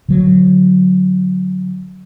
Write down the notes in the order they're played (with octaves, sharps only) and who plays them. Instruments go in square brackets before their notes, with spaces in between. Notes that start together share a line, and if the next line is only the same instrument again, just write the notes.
[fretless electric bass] D3 F#3